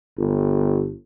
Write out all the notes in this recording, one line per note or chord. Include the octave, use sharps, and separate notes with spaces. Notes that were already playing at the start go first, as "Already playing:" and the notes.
G1